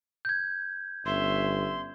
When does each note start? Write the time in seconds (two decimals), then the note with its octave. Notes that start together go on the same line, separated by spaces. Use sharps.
0.25 G6 G#6
1.06 G1 C#4 E5 C6